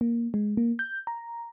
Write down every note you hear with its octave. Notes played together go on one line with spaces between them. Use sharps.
A#3
G#3
A#3
G6
A#5